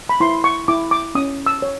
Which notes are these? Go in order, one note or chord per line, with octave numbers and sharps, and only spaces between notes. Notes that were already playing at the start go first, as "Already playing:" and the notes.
B5
E4 C6
C#6
E4 D6
D6
C#4 D#6
E6
C#5